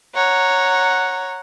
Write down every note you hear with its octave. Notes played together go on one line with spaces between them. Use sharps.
C#5 F#5 A#5